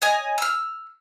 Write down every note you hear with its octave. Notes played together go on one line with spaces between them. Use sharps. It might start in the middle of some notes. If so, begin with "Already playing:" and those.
C#5 D#5 G#5
E6 F6